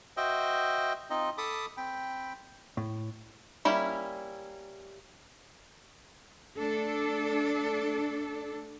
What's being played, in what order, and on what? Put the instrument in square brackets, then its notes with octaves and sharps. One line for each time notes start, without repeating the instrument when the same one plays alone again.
[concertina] F#4 C5 D#5 E5 G5
C4 D#4 F4 D#5
A4 A5 B5 D6 D#6
C4 G5 B5
[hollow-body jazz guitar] A2
[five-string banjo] G3 A#3 C#4 E4
[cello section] A3 D4 A4